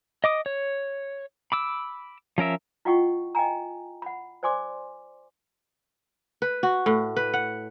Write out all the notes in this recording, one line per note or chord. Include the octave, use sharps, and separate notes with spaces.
D#5 D6 D#6
C#5
B5 D6 E6
F3 C#4 A#4 E5
E4 F4 D#5 F#5 G5 C#6
D#5 G5 G#5 A#5
F#5 B5
C5 D5 G#5 C6 D6
B4
F#4
A2
B4
F#5